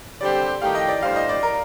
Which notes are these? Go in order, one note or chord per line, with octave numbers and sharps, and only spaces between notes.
D3 G3 C4 G4 C5 D5
D#3 A3 D#4 G4 F5
D#5
D5
A2 G3 D4 G4 C5 F5
D#5
D5
A#4